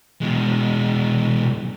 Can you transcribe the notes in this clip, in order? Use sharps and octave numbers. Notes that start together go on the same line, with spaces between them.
B2 G#3